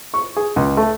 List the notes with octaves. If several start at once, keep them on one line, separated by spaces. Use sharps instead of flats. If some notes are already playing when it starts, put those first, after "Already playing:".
C#6
G#4
C#2
A3